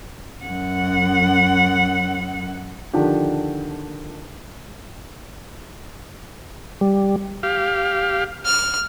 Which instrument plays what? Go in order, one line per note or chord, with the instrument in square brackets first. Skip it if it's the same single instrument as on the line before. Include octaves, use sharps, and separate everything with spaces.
[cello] F#2 F#5
[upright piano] D3 D#3 F3 D4 G4
[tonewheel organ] G3
[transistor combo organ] G4 F5
[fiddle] F6